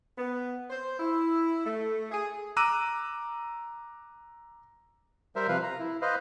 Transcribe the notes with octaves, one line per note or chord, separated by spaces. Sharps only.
B3
C5
E4
A3
G#4
A#5 D6 E6 F#6 D#7
G3 A#4 C5 E5
C3 F3 B4 F5
A#5
E4
B4 C5 D#5 F5